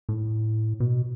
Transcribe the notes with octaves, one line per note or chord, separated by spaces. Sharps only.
A2
B2